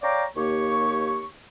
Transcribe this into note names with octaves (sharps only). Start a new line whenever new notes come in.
C#5 D5 F5 G5 A#5 D6
D#2 A#3 G4 C#5 C#6